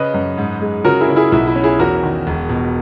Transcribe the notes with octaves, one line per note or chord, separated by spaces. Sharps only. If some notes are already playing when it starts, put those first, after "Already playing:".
Already playing: C#3 B4 D#5
F#2
G#2
G#3
C#3 F#4 A#4
E4 G#4
C#3
E4 G#4
B1 E4
E4
C#4
E4 G#4
E2 F#4 A#4
D#3
E1
B2